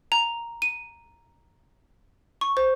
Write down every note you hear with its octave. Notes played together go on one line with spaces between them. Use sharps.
A#5
D#7
C#6
C5